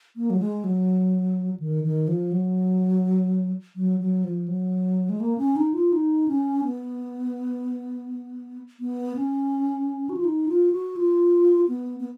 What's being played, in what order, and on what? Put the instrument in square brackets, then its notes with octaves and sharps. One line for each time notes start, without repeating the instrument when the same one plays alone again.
[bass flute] A#3
F#3
G#3
F#3
D#3
D#3
F3
F#3
F#3
F#3
F3
F#3
G#3
A#3
C#4
D#4
F4
D#4
C#4
B3
B3
C#4
F#4
F4
D#4
F4
F#4
F4
B3
B3